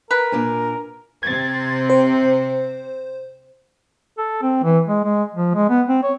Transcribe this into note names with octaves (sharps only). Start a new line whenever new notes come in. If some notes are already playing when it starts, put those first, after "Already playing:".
A#4 B4
A#2 D4 G#5
C3 C4 G#6 A6
C5
A4
C4
E3
G#3
G#3
F3
G#3
B3
C4
C#5